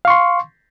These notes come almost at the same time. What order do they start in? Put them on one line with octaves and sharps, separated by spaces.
F5 C#6 C6